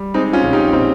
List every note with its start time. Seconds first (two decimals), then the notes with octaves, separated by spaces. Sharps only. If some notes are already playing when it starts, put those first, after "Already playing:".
Already playing: G3
0.14 G#3 C4 D#4
0.33 C#4 F4
0.43 A#1
0.53 D#4 G4
0.73 A#2 C4 D#4